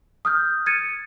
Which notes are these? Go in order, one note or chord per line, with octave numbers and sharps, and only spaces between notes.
D#6 F6 G6
G#6 A6 C#7 D#7